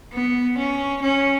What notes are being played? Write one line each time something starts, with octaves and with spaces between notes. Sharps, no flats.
B3
C#4
C#4